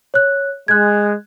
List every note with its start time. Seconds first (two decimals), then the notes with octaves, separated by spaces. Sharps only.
0.14 C#5 F#6
0.68 G#3 F#6 G#6